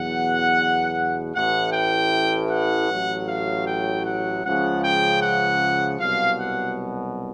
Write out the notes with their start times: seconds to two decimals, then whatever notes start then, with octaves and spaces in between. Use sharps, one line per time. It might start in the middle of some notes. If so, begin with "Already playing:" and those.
Already playing: E2 B2 F#3 F#5
1.34 A1 A2 E3 F#5
1.72 G5
2.50 F#5
2.89 A1 A2 F#3
3.28 F5
3.67 G5
4.05 F#5
4.44 C#2 C#3 F3 F#5
4.83 G5
5.22 F#5
5.99 C2 B2 F#3 F5
6.39 F#5